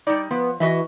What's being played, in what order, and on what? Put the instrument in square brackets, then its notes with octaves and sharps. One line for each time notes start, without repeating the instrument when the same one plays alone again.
[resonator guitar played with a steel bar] G3 D#4 [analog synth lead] D5
[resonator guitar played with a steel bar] F3 [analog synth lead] B3
[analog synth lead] E3 [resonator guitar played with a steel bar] F#4 D#5 E5